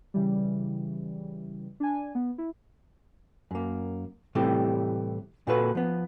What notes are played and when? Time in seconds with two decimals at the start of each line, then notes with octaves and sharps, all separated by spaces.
0.14 C#3 E3 G3
1.80 D4 G#5
2.15 B3
2.38 E4
3.51 F#2 A#3
4.35 A2 C3 E3 G3 A3 G4
5.47 A#2 A#3 F#4 A4 B4
5.75 F3 B3